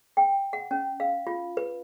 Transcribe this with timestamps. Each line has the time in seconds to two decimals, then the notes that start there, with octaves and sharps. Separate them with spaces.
0.17 G5
0.53 F#5
0.71 C#4
1.00 F5
1.27 F4
1.57 B4